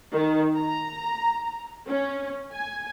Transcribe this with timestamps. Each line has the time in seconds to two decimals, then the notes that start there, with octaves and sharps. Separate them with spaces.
0.12 D#3
0.56 A#5
1.87 C#4
2.52 G#5